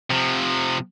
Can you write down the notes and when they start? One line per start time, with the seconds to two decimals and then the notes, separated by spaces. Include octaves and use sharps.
0.10 C3 F3